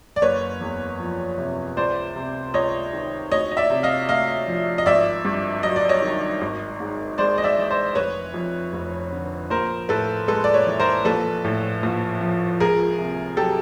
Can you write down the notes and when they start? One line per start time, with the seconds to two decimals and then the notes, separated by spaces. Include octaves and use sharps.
0.16 D5
0.22 F#1 B4 C#5
0.61 E2
1.00 F3
1.38 C3
1.77 C#2 C5 D5
2.16 C3
2.54 C#2 C#5 D#5
2.93 D#3
3.31 D2 C#5 D#5
3.51 D#5
3.57 D5 E5
3.70 C3
3.83 D#5 F5
4.09 A3 D#5 F5
4.47 F3
4.78 D#5
4.86 G#1 D5 E5
5.25 G2
5.63 F#3 D#5
5.76 D5
5.89 C#5 D#5
6.02 D#3
6.41 G#1
6.80 G#2
7.18 G#3 C5 D5
7.38 D#5
7.44 D5 E5
7.57 E3
7.70 C5 D5
7.95 F1 B4 C#5
8.34 F2
8.73 F1
9.12 D3
9.50 A#1 A#4 C5
9.89 A2 A4 B4
10.28 G#3 A4 B4
10.44 D5
10.54 B4 C#5
10.67 E3
10.80 A#4 C5
11.05 A#1 A4 B4
11.44 A2
11.83 A#1
12.21 F3
12.60 C#2 G#4 A#4
12.99 C3
13.37 F#3 G4 A4